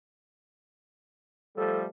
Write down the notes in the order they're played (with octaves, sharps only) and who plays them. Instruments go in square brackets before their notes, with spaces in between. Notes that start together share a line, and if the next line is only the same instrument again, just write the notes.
[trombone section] F3 G3 A3 [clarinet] A4